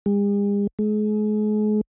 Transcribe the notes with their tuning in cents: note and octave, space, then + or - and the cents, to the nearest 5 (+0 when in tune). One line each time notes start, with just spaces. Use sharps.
G#3 -45
G#3 +35